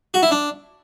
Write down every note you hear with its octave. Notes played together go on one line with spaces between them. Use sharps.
F#4
E4
D4